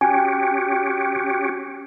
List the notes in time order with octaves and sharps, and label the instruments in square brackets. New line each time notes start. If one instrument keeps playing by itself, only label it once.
[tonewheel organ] C#4 F#4 G4 [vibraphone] G5 [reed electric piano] G#5